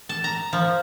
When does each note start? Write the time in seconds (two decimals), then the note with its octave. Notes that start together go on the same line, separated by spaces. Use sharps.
0.09 A5
0.24 A#5
0.53 F3